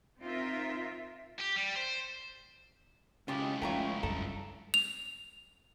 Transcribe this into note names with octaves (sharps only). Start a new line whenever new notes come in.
C4 D#4 F4 A#4 E5
G4
G3
C5
C#2 C#3 E4 F4 G4 D#5
F3 G#3 A3 C#4 F4 G5 A#5 C#6
G2 F#3 A4 A#5
F7